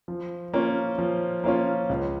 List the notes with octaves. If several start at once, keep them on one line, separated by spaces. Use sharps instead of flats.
F3
A#3 C#4 F4
F3
A#3 C#4 F4
C#2